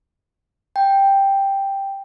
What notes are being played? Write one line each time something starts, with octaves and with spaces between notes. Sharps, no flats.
G5